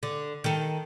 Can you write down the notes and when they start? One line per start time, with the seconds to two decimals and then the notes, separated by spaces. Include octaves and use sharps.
0.03 D3
0.44 D#3 A4